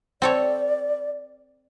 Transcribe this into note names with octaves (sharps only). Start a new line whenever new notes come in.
C4 A4 C#5 D5